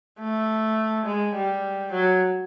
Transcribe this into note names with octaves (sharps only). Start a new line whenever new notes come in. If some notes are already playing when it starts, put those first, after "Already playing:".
A3
G#3
G3
F#3